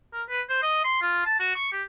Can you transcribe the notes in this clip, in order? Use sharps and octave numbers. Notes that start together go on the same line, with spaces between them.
A#4
B4
C5
D#5
C6
F4
A5
F#4
C#6
G4